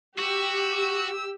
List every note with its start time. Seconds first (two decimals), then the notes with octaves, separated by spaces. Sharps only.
0.18 F#4 G4 E6